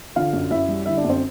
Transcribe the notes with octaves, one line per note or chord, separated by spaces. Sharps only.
D3 F4 F5
F#2
F#2 E4 E5
G3
D3 E4 E5
D4 D5
F#2
C4 C5